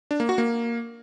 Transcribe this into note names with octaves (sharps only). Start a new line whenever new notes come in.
D4
A#3
F#4
A#3